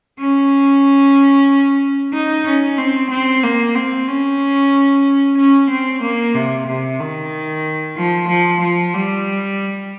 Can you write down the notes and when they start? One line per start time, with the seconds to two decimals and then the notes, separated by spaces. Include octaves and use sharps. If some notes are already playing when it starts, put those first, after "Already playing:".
0.19 C#4
2.13 D#4
2.46 C#4
2.78 C4
3.10 C4
3.43 A#3
3.75 C4
4.08 C#4
5.37 C#4
5.70 C4
6.02 A#3
6.35 C3
6.67 C3
7.00 D#3
7.97 F3
8.28 F3
8.61 F3
8.94 G3